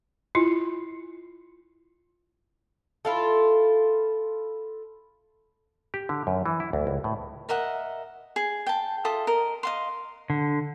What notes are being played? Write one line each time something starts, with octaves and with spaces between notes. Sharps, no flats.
E4 F4
E4 F4 A4
G4
D3
F#2
E3
E4
D2
C#2
A2
A#4 D#5 E5 F#5
G#4
G5 A5
F4 A4 E5 D#6
A#4 D#5
D#5 F5 C6
D3